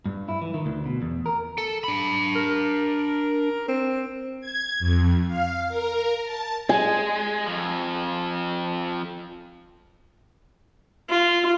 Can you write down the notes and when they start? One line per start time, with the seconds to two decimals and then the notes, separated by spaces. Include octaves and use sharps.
0.06 G2
0.29 E4
0.42 E3
0.54 D#3
0.66 D2
0.86 B2
1.02 E2
1.26 A#4
1.58 A4
1.84 D4 B5
2.36 A#4
3.68 C4
4.40 G#6
4.80 F2
5.27 F5
5.68 A#4
6.24 A5
6.69 G#3 G#5
7.47 F2 F3
11.09 F4